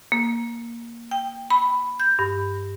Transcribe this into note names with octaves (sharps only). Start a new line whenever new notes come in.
A#3
G5
B5
G6
G2